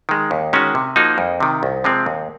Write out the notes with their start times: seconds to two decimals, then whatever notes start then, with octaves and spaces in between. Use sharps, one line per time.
0.09 D#3 G#3
0.31 D#2
0.53 D#3 G#3 C#4 F#4
0.75 C3
0.96 F3 A#3 D#4 F#4
1.18 F2
1.40 C3 D#3
1.63 C2
1.84 C3 F3 G#3 C4
2.06 D#2